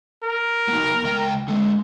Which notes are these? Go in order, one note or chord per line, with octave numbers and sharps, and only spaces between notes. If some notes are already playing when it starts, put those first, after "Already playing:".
A#4
B3 D#4
C#2 G5
D3 G#3